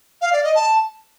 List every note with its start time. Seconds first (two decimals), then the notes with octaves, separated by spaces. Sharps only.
0.21 F5
0.33 D5
0.44 D#5
0.55 A5